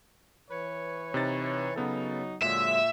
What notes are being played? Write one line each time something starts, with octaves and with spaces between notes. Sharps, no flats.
E3 B4 C#5
C3 D#4 A6
C#3 F#3 B3 D#4 A4
A#2 D3 F#3 G#3 E5